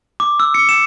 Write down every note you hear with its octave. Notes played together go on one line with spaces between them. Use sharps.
D6
E6
C#7
E7